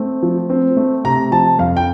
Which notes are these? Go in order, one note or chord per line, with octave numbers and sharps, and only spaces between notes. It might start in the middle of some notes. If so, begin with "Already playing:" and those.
Already playing: A3 C4
F3
C4
A3
C3 A#5
F3 A5
F2 F5
G5